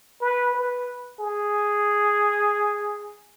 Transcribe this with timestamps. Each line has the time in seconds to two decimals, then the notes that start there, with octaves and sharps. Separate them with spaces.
0.21 B4
0.55 B4
1.20 G#4